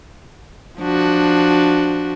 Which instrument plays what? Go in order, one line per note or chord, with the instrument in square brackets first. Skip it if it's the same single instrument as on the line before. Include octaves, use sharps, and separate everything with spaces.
[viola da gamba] F3 D4 F#4